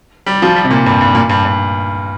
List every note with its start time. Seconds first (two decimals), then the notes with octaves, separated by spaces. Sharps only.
0.26 G3
0.42 F3
0.56 G3
0.64 C3
0.71 A#2
0.86 G2
1.01 G2
1.15 A#2
1.29 G2
1.45 G2